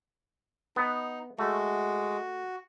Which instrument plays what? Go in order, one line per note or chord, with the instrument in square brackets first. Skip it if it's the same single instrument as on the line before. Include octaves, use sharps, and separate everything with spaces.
[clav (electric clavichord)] B3 [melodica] D#4
[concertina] G#3 [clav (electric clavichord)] A3 [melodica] F#4